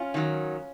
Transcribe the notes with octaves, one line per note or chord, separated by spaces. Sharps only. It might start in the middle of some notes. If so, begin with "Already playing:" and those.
Already playing: C#4 F4
D#3 F#3